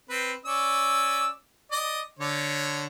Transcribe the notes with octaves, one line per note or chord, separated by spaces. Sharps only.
C4 B4
C#4 D5 E6
D5 D#5
D3 C#5